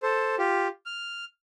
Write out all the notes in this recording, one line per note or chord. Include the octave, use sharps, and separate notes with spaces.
A4 C5
F4 G4
F6